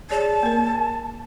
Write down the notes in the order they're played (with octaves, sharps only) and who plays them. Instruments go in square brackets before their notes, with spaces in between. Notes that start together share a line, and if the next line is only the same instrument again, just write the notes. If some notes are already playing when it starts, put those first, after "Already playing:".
[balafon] G#4 C#5 D5 [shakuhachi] A5
[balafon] A#3 A#4